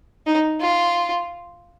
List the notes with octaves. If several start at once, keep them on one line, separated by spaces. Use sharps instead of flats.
D#4
F4